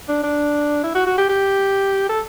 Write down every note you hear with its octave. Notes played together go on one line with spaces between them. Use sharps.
D4
D4
E4
F#4
F#4
G4
G4
A4